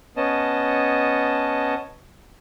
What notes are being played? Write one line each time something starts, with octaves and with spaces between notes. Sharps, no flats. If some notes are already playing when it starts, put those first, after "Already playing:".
B3 C#4 D#5 A5